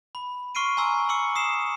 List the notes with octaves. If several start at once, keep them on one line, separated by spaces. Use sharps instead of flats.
B5
C6 C#6 F6 C7 D7 D#7
G#5 A#5 C6 E6
C6 D6 E6 C#7
D#6 C7 E7